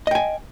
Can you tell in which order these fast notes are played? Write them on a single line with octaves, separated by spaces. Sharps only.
D#5 G5 G#5